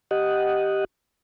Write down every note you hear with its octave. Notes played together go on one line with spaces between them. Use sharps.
G4 D#5 F#5